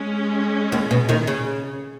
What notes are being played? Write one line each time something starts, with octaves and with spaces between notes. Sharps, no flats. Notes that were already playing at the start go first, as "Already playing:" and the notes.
Already playing: G#3 C#4 G#4
D#2 D#3
B2
D#2 D#3
C#3